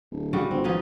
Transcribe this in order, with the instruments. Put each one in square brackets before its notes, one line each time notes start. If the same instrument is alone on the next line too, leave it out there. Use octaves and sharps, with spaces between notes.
[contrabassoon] D1
[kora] C#3 G3 F#4
[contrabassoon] G1 [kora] C4
[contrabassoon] G#1 [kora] F3 D#4 B4